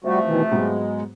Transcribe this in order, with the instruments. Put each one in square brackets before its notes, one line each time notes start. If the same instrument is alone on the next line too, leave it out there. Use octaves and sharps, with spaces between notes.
[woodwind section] C3 F3 A3 [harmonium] G3 F#4
[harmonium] B2 D#3 E3
[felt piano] G#2 F#3 B3 [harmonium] G#3